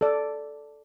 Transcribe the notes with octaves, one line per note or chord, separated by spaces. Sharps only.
A4 D5